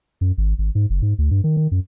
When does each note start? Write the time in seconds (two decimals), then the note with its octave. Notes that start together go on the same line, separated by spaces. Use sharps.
0.21 F#2
0.38 G#1
0.58 G#1
0.75 G#2
0.90 F#1
1.02 G#2
1.18 D2
1.31 G2
1.44 D#3
1.57 D#3
1.71 F#2